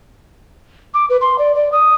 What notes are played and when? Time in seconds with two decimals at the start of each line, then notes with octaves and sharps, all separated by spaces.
0.94 D6
1.10 B4
1.21 C6
1.39 D5
1.55 D5
1.72 D#6